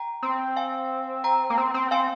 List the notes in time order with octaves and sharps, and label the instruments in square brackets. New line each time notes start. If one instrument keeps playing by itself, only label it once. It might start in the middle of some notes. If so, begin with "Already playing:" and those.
Already playing: [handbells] G5 A#5
[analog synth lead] C4
[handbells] F5 G#5
G5 A#5
[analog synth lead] A#3
C4
C4
[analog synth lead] C4 [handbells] F5 G#5